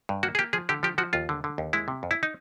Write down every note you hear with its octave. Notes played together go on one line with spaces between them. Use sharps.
G2
A#3 F#4
G#4
A#3 G4
F3 G#4
D3 G4
F3 G4
F3 F#4
D#2 F4
D3
D3
D#2
G#3 E4
C3
F2
E4
D#4